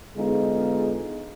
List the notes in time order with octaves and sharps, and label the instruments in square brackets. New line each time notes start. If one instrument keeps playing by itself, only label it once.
[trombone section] D3 G#3 B3 D#4 F4 G#4